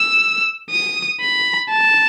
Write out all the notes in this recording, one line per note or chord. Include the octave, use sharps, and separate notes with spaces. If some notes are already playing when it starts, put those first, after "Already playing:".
Already playing: E6
D#6
B5
A5